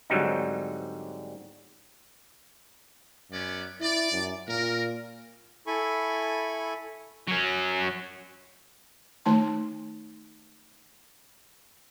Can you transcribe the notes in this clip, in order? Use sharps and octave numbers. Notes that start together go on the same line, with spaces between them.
G#2 D3 F#3 G3 C4 D#4
F#2 B3 C#4 D5
E4 D5
F#2
A#2 A#4
E4 A4 G#5 B5 C#6
F#3 C#4
D#3 A3 D#4 A5 C6